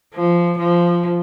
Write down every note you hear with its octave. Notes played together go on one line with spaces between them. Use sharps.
F3
F3